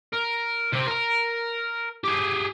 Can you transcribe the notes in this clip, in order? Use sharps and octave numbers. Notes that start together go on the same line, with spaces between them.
A#4
C3 C4
A#4 A#5
G4 G#4